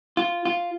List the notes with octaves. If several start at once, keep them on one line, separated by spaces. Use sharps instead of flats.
F4
F4